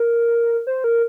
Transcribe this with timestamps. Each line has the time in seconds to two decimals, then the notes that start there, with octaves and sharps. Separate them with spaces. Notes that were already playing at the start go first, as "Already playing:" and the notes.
Already playing: A#4
0.67 C5
0.84 A#4